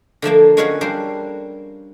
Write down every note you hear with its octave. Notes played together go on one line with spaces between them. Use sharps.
D3 F3 A3 A#3
G#3 C#4 F#4 B4 C#5 F5
G3 A#3 D4 C5